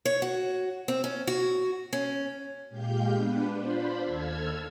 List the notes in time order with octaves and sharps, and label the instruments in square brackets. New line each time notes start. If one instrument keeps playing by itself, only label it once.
[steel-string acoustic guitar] C#5
F#4
C4
C#4
F#4
C#4
[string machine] A#2 G#3 G4 F5 G6
B3 D4 B4
D4 F4 C5 B5
D#2 A4 E6 F6 G#6